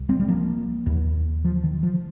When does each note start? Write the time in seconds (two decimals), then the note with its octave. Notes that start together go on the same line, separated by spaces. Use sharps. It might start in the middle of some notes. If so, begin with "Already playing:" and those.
Already playing: C2
0.09 G3 C4
0.20 G3
0.28 F3 A#3
0.86 D#2
1.44 F3
1.64 D#3
1.83 F3